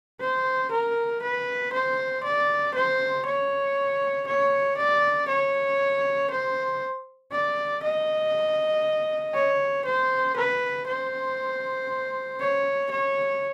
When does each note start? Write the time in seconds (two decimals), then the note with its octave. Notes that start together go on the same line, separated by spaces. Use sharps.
0.20 C5
0.71 A#4
1.22 B4
1.73 C5
2.24 D5
2.75 C5
3.26 C#5
4.27 C#5
4.78 D5
5.28 C#5
6.30 C5
7.32 D5
7.83 D#5
9.35 C#5
9.85 C5
10.37 B4
10.87 C5
12.40 C#5
12.91 C#5